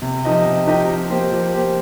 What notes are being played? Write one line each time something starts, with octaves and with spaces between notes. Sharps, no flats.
C3
F3 D#4 G4 D#5
C3
F3 D#4 G4 D#5
F3
A#3 G4 C5
F3
A#3 G4 C5